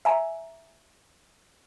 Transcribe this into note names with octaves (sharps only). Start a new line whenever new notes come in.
E5 G#5 A#5